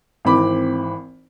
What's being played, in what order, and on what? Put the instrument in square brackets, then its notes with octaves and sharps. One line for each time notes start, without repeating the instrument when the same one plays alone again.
[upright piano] G#1 E3 C4 B5 D6